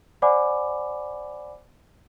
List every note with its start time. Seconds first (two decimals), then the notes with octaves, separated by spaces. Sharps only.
0.22 C5 D5 F#5 G#5 B5 D6